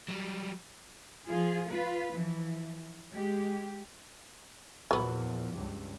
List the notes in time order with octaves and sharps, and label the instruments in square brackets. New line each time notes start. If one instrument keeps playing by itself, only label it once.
[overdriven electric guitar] F#3 G3
[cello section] F3 F4 G#4
F4 B4
E3 F3
G#3 G4
[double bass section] E2 A#2 F3 [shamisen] F#3 B3
[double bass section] C#2 G2